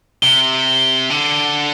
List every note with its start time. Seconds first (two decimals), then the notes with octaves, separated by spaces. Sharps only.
0.22 C3 G7
1.10 D3